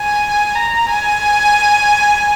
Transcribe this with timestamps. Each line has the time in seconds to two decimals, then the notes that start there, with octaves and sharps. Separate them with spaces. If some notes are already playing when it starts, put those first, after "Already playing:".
Already playing: G#5
0.55 A#5
0.91 G#5